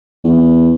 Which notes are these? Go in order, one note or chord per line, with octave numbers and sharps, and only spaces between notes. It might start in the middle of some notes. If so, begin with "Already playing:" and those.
E2